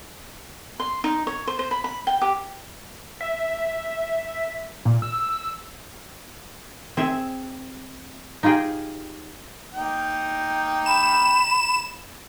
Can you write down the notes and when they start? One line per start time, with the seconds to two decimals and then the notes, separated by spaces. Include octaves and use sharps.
0.80 C6
1.04 D#4
1.27 C#5
1.47 C5
1.59 C5
1.71 B5
1.84 B5
2.07 G5
2.22 G4
3.21 E5
4.85 A#2
5.02 E6
6.97 C4 G#4 E5
8.43 D#4 F4 G4 G#4 G5
9.74 A#3 D#4 G5
10.86 B5 E7